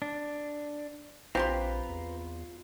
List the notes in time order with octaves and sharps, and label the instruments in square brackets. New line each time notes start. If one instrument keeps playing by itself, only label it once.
[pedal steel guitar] D4
[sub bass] A#1 [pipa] C4 G4 C6 [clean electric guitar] F4 [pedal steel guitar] B4 A#5
[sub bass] E2